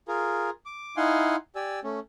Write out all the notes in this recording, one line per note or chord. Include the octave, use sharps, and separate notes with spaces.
F4 G#4 A#4
D6
D#4 E4 F5 F#5 G#5 C6
G4 D5 G#5 E6
A3 C#4